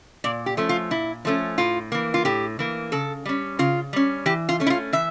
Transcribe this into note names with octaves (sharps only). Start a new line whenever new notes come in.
A#2 D5
G4
F3 A3 C#4
F4
A#2 E4
F3 A3 C#4
A2 F4
E3 A#3
F4
A2 G4
E3 A#3
C#3 A4
G3 C#4
C#3 F4
G3 C#4
E3 G4
F4
A3 C#4
E4
F4
E3 E5